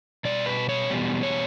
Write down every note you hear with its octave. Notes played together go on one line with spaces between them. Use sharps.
B2 G3 D5
B4
C#5
E2 B2 G3
C#5